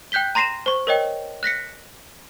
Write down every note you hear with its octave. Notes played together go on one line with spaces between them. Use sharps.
G5 F#6 G6 B6 G7
A#5 C6 A#6 C7 D#7 E7
C5 C#6
A#4 C#5 D#5 G5
F#6 A#6 B6 C#7